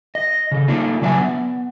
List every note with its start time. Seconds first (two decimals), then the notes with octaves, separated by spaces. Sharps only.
0.15 D#5
0.52 C#3 A4
0.68 A3 A#3 D4 D#4 F4
1.02 C#3 F#3 D4 B4 E5 G#5
1.18 B3